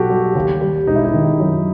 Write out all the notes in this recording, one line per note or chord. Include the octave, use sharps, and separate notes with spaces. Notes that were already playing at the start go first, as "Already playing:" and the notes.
Already playing: B1 F#4 G4 A4
G3
D#2
G3
E1 D#4
E4
D#4
D#3
F#2